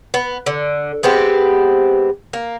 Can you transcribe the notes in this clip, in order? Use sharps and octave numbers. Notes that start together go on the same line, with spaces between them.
B3
D3
G#3 B3 C4 G4
A#3